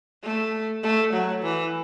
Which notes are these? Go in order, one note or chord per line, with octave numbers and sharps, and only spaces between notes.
A3
A3
F#3
E3